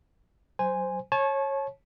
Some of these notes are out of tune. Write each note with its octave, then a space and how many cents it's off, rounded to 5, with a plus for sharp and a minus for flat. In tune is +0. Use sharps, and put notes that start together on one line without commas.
F#3 +20 C5 -10 G#5 -10
C#5 -20 A5 -35